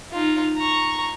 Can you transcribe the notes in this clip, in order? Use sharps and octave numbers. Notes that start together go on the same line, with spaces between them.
D#4 F4
A#5 C#6